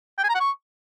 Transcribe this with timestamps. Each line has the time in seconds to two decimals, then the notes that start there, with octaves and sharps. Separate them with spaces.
0.18 G5
0.24 G#5
0.29 A#5
0.35 F#5
0.40 C#6